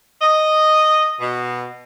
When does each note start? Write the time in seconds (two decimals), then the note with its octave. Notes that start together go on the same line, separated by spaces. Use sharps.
0.22 D#5
1.20 B2